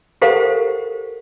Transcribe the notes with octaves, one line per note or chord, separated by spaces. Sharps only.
G4 A4 A#4 C5 F5 F#5